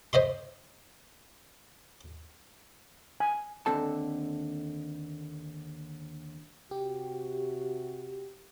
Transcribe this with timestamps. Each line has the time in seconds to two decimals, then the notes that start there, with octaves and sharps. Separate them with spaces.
0.13 C5 D#5 E5 C6
3.20 G#5
3.66 D#2 D3 C4 A4 A5
6.71 C3 F#4 G4